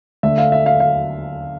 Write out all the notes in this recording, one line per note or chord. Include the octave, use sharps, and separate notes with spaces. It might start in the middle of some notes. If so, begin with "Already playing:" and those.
D3 A3 E5
F5
E5
F5
F5